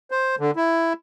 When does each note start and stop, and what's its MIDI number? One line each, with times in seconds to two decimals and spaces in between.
0.11 0.35 72
0.39 0.51 50
0.56 0.93 64